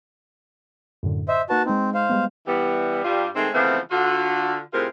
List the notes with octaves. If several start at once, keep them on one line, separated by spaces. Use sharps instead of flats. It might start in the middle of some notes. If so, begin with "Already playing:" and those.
F#2 A2 D3
C5 D#5 E5
A#3 D#4 F#4 B4 A5
G#3 C4 D#4
C5 F5
G3 G#3 B3
E3 G3 B3
G2 G3 F4
D#3 G#3 A3 C4
C#3 E3 F3 A3 B3 C4
D3 F4 F#4
A2 C3 C4 F4 G#4 A#4